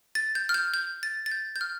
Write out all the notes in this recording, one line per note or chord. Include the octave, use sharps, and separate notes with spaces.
A6
G6
F6
G6
G6
A6
A6
G6
G6
F6